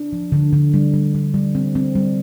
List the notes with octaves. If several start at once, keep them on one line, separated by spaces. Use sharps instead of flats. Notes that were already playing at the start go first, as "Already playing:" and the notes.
Already playing: D4
F3
D3
D3
G3
G3
G3
G3
C4
C4
G3